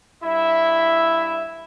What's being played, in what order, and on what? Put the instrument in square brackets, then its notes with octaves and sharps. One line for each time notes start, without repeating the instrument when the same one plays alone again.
[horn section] G2 E5 [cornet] E4